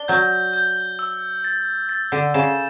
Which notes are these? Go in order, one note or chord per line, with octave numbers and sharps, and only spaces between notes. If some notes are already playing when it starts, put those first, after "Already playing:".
Already playing: D4 G7
F#3 G6
G6
E6
A6
A6
D3
C#3 E7